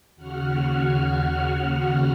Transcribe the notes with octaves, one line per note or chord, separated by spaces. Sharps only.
D#2 C#3 F#4 F#5 F6